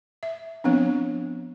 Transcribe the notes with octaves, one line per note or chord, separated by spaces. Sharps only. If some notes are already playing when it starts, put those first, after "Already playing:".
E5
F3 B3 C4 D4